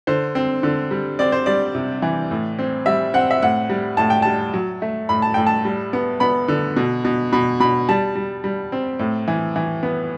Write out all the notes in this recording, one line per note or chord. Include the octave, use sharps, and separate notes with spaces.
D3 C5
C4
D3
G3
C4 D5
C5
G3 D5
C3
E3
A2
C4
G3 E5
C4 F#5
E5
A2 F#5
G3
A2 A5
G5
G3 A5
F#3
A3
A2 B5
A5
A2 G5
A5
G3
B3
B3 B5
D3
B2
B2
B2 B5
B2 B5
G3 A5
G3
G3
C4
A2
E3
E3
B3